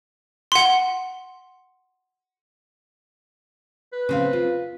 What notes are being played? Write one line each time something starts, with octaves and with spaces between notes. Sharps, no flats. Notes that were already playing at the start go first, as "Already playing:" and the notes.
F#5 C6
B4
C#3 C4 F5
F4